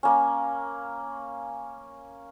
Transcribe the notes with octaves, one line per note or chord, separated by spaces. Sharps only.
A#3 C#4